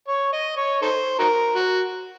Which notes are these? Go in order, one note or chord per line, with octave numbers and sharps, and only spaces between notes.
C#5
D#5
C#5
D#4 A4 C5
D#4 F#4 A#4
F#4